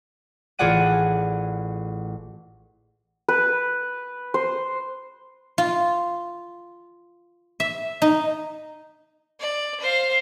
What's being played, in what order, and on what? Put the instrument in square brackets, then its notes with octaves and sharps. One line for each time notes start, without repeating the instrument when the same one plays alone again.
[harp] A1 F4 G#4 D5 F#5 D#7
[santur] B4
C5
[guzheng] F4
E5
D#4
[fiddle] D5
C5 F5